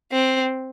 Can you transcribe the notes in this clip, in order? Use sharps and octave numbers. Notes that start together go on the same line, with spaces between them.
C4